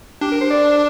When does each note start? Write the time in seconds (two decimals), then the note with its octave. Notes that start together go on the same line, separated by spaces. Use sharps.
0.21 D4 G4
0.32 A#4
0.41 C5
0.50 D5